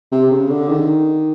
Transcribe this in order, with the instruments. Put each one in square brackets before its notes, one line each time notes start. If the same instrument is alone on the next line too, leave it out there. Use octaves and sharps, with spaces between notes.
[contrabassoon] C3
C#3
D3
D#3